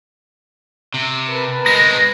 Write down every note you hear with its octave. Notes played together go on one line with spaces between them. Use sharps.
C3
A#4 B4 A5
G#3 C4 A#6